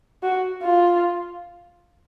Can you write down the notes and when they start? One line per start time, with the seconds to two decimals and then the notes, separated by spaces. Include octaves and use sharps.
0.23 F#4
0.63 F4